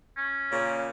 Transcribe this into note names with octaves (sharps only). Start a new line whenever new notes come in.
C#4
A#2 C#3